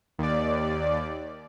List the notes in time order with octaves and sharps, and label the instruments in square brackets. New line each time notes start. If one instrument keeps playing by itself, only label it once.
[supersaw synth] D#2 D5